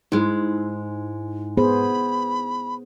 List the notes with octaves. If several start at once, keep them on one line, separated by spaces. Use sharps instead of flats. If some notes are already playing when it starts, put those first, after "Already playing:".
G#2 G#3 D#4 E4
B3 G#4 C5 B5